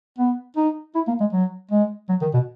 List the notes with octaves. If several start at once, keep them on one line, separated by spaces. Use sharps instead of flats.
B3
D#4
E4
A#3
G#3
F#3
G#3
F#3
D#3
B2